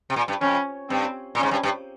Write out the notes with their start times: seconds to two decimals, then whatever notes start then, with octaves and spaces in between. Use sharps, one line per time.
0.10 C3
0.16 A#2
0.28 G2
0.41 F2 C#4
0.90 G2 C4
1.35 A#2
1.39 G#2 C#4
1.51 G2
1.63 G2